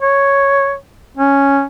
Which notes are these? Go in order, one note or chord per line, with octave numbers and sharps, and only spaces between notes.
C#5
C#4